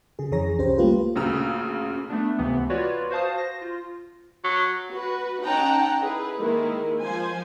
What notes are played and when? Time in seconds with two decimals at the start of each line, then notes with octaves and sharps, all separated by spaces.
0.19 C#3 G#4
0.32 F2 E3 G#4 C#5 A#5 A#6
0.58 C2 C#4 G4 C5
0.78 G3 A3 A#3 F4 G4 B4
1.16 D2 A#2 C#3 A#5 E6
2.10 A3 B3 D4
2.38 C#2 C3 E3 B3
2.69 F4 F#4 B4 C#5 D5
3.10 F#4 C5 F5 A5 D#6
3.34 C5 A#6
3.61 F4
4.44 F#3
4.90 F#4 B4
5.43 C#4 D#4 F#5 G5 A5 A#5
6.01 E4 G#4 A4 B4
6.39 D#3 G#3 A#3 E4
7.02 F3 C5 G#5